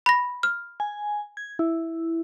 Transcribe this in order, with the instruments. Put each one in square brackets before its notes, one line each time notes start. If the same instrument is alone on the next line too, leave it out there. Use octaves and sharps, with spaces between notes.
[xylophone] B5 A#6
F6
[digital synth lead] G#5
G#6
E4